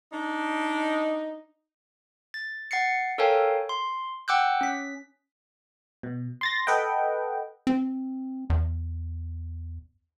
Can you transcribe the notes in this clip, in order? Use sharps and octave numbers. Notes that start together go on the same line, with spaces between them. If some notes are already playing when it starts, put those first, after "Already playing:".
D4 D#4
A6
F#5 A6 C7 C#7
A4 A#4 C#5 F5 G5 G#5
C6
F#5 G5 D6 E6 F#6 G6
C#4 B6
B2
C6 A6 A#6
A4 B4 D#5 F#5 G5
C4
E2